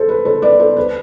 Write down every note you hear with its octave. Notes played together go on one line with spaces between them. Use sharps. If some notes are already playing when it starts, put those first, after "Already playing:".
Already playing: A4 C5
B4
A4 C5
B4 D5
A4 C5
B4